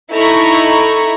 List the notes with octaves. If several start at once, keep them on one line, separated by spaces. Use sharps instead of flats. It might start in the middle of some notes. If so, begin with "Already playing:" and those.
D#4 E4 A4 A#5 C#6